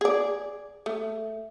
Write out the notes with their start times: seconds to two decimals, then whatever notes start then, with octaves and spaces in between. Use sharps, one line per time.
0.01 G#4 D5
0.86 A3